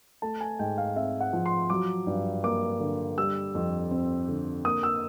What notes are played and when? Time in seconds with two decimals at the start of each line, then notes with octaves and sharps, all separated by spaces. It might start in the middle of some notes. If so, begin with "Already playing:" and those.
0.22 A3 A5
0.41 G#5
0.59 G#2 G5
0.78 F5
0.96 C4 E5
1.21 F#5
1.33 F3
1.46 C6
1.70 F#3 D6
2.07 G2
2.44 A#3 D6
2.80 D3
3.18 G3 E6
3.55 F2
3.91 C4
4.28 D3
4.65 A#3 D#6
4.83 E6